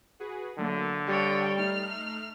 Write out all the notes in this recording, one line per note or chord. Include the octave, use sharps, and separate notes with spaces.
F#4 G#4 B4
D3 F#3 A3 A#3
G3 C#5 F5 G5 C6 D#6
A3 D#4 F6 C7